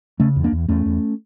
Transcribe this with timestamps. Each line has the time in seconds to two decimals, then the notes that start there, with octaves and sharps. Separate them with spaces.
0.20 C#3 A3 C#4
0.36 E2
0.44 A#3 D4
0.52 E2
0.68 E2 A3 C#4
0.86 E2